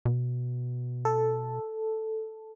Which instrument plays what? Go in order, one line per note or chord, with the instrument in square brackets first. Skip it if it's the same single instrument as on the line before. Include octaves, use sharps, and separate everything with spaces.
[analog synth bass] B2
[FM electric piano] A4